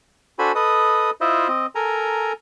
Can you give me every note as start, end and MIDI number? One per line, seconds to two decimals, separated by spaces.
0.39 0.52 62
0.39 0.52 66
0.39 0.52 69
0.39 0.52 72
0.39 0.52 80
0.39 0.52 83
0.55 1.10 69
0.55 1.10 71
0.55 1.10 75
0.55 1.10 87
1.21 1.48 64
1.21 1.48 65
1.21 1.48 72
1.21 1.48 75
1.21 1.48 76
1.48 1.66 60
1.48 1.66 75
1.75 2.33 69
1.75 2.33 70
1.75 2.33 80
1.75 2.33 82